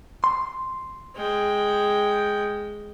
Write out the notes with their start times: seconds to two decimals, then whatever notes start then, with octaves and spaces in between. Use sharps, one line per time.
0.24 C6
1.16 G#3 G5